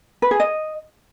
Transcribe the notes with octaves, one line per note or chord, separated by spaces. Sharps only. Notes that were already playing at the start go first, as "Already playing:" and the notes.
B4
G#4
D#5